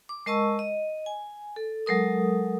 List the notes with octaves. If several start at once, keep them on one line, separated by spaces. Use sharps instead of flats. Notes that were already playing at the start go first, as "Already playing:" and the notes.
D6
G#3 A#4 D#5 A5 C#6 E6
D#5
G#5
A4
F#3 G#3 A4 A#4 D#6